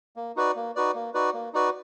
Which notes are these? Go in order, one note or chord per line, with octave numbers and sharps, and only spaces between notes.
A#3
D#4 F#4 B4 D5
A#3
D#4 F#4 B4 D5
A#3
D#4 F#4 B4 D5
A#3
D#4 F#4 B4 D5